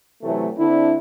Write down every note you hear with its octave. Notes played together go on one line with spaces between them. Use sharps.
C3 E3 F#3 A3
D3 C4 D4 E4